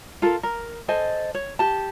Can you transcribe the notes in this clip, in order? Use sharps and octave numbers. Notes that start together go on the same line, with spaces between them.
F4 A4 A#4
A#4
A4 C5 D#5 G#5
C#5
G4 A5